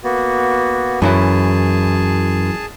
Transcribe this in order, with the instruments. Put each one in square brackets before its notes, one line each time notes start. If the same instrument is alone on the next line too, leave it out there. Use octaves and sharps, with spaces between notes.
[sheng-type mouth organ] A#3 B3 F#4
[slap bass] F#2 [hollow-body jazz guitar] E3 F#3 E4 [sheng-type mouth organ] G#4 A5